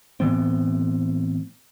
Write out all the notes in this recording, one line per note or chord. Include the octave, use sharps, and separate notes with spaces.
A2 E3 B3 C4